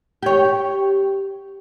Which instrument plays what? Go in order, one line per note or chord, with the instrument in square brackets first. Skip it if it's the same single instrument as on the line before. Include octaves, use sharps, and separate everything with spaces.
[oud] G4 C#5